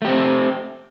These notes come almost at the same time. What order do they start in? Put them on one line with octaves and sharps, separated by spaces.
A3 G4 C4